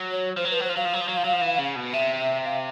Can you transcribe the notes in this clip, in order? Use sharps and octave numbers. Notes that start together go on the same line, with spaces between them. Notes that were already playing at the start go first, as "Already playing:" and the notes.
Already playing: F#3
C#5
F3 C5
F#3
F3 B4
F#3 C5
F3
F#3 F5
F3
F#3
F3
F#3
F3
F#3
F3
E3
C#3
B2
C3 E5
E5
F5